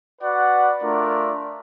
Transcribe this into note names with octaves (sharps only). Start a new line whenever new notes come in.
F#4 B4 D5 F#5
A3 D4 F4 A#4 D5